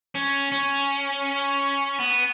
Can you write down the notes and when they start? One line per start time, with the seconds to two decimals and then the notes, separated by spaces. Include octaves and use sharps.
0.15 C#4
0.52 C#4
1.99 B3